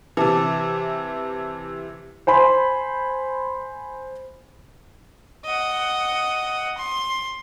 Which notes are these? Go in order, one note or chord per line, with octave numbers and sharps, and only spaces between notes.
C3 E3 G4 A5
C5 G#5 B5 C6
D#5 F#5
C6